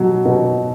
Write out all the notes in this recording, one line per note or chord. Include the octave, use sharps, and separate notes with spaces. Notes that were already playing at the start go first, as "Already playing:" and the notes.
Already playing: B2 F#3
B2